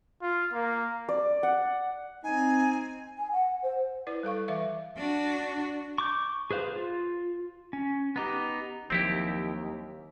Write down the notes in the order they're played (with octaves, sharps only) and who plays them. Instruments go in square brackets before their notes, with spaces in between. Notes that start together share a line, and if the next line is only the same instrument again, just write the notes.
[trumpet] F4
A#3
[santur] D5
F#5
[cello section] C4 [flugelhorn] D#4 [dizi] G#5
[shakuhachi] G#5
F#5
C5
[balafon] E4 B4 D5
G3 A4 F5 C#6
E3 B4 E5 F5 D6
[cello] D4 F#4
[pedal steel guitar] C#6 D6 G6
G#4 B4 C5 F5
F4
C#4
B3 D#4 G4
[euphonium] D#2 [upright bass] F3 F#3 [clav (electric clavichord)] C4 E4 G4